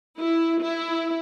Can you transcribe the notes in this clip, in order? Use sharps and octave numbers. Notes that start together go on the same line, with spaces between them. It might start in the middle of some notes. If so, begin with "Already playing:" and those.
E4
E4